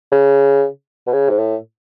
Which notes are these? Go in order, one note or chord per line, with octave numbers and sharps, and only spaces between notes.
C#3
B2
C#3
G#2
A2